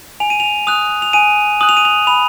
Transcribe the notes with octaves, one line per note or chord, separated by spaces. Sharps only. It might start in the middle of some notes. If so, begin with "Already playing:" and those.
G#5 F7
D#7
F7
D#6 F#6 F7
F7
G#5 D#7
D#6 F#6 F#7
F7
D#7
F7
B5 F7